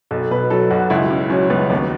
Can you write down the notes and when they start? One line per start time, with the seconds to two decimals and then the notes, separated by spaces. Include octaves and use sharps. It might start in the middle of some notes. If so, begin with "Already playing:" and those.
0.11 B1 A4
0.31 B2 B4
0.50 F#3 A4
0.70 B1 F#4
0.90 C#2 E4
1.10 C#3
1.30 F#3 C#4
1.50 C#2 B3
1.70 D#2 B3